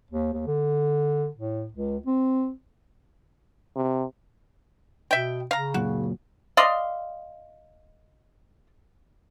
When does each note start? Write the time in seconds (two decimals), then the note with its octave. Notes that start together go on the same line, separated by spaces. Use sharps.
0.11 D#2
0.33 D#2
0.47 D3
1.35 A2
1.72 C#2
2.06 C4
3.76 C3
5.11 B2 E5 G5
5.51 C#3 F5 A#5
5.74 F#1 A#2 F#3 F#4
6.57 D5 D#5 F5 C6